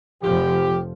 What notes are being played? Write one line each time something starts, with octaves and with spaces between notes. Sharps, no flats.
F1 F3 G4